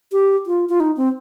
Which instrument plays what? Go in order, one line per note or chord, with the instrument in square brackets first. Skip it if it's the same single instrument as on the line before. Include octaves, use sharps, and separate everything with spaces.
[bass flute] G4
F4
F4
D#4
C4